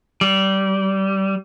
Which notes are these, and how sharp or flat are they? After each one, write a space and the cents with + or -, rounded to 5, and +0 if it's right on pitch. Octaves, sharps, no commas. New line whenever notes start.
G3 -20